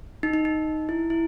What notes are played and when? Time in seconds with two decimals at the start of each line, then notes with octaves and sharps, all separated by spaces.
0.23 D#4
0.34 D#4
0.45 D#4
0.89 E4
1.10 E4